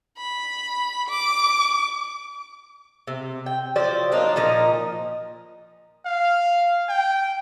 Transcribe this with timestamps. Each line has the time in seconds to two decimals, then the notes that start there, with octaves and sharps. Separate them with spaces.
0.18 B5
1.08 D6
3.07 C3
3.46 G5
3.76 F3 F#3 C5 D5
4.12 F#3 A#3 D4 D#4
4.36 A#2 F3 D#4 A#4
6.05 F5
6.89 G5